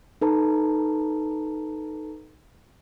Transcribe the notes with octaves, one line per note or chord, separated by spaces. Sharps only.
D#4 A4 B4 A5 A#5